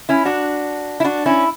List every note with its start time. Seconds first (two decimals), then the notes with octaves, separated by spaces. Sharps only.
0.09 C#4 E4
0.25 D4 F#4
1.00 E4
1.04 D4 F#4
1.26 C#4 E4